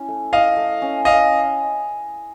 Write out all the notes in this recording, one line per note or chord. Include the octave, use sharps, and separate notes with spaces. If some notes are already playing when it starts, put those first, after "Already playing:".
Already playing: C#4 E4
A3
E4 D#5 F5
A3
C#4
C#4 D#5 F5